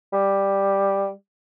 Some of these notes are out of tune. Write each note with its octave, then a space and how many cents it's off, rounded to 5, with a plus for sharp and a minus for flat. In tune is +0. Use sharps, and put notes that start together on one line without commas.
G3 +5